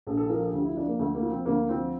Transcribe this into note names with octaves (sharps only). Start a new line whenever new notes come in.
A#1 A4
A4
F3 A#4
A4
D2 G4
E4
F3 D4
A#3
D2 A3
A#3
F3
C4
D2 A#3
F3 C4